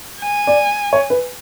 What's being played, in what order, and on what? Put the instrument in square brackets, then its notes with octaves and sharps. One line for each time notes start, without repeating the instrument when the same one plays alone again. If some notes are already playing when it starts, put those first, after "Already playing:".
[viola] G#5
[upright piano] D5
C#5
B4